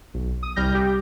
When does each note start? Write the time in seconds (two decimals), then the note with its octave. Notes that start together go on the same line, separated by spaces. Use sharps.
0.14 B1
0.43 D#6
0.56 C2 G3 F6 G6 A#6
0.74 G4